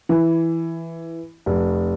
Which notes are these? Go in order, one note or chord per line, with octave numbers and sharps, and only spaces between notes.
E3
F1